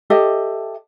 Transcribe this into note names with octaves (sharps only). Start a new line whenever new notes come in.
G4 A4 D#5 E5